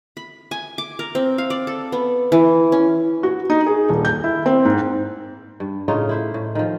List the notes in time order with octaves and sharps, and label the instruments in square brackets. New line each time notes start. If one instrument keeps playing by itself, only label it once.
[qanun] B5
G#5
D6
A#4
C4
F5
D5
A4
B3
E3
C#4
[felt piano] F#4
D#4
G#4
D#1
G6
E4
C4
G#2
[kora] G2
A2 C#3 D#4 F4
E4 C5 E5
A2
D#3 F3